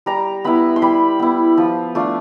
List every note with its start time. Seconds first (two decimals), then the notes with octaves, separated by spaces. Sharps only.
0.06 G3 A#5
0.44 B3 E4 B5
0.76 C6
0.82 G3 B5
1.19 B3 E4
1.57 F3
1.95 A3 D4 F4